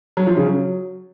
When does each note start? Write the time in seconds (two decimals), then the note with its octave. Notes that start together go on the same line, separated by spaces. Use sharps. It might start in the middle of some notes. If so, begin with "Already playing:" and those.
0.17 F#3
0.27 F3
0.37 C#3
0.47 F#3